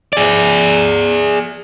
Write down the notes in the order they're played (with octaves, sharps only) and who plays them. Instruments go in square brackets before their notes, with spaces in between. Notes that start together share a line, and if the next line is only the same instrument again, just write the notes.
[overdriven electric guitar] G#4 D5